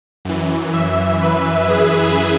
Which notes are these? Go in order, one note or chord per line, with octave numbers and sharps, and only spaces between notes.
F#2 E3
E5
B4
G#4